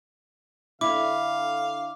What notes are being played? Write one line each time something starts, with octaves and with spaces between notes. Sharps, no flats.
D3 E4 F5 D6